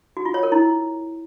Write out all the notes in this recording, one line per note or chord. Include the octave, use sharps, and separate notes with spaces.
F#4
F4
C#5
A#4
E4